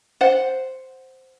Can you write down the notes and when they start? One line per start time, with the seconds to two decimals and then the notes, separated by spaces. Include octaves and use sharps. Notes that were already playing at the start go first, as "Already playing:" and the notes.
0.21 C5 F#5